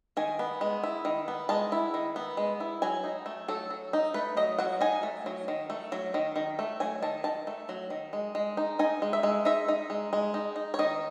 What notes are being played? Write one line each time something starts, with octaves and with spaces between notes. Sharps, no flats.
D#3 G#5
B3
G#3
E4
D#3
B3
G#3 A5
E4
D#3
B3
G#3
E4
F#3 G#5
D#4
A3
F#3 A4
F#3
D#4
A3 B4
F#3 D#5
F#3 F#5
D#4 G#5
A3
F#3
D#3
A3
F#3
D#3
D#3
A3
F#3 G#5
D#3 A5
D#3 A5
A3
F#3
D#3
G#3
G#3
D#4
D#4 G#5
G#3
E5
G#3
D#4 E5
D#4
G#3
G#3
D#4
D#4
C#5
D#3 D#5